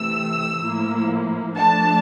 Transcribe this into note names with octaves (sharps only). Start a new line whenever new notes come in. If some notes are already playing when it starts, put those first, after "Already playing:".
Already playing: C3 E3 A3 E6
A2 F3 A#3 E4
F3 A3 D4 A5